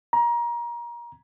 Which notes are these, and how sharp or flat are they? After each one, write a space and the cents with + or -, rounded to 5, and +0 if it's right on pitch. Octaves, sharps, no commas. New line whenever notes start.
A#5 +25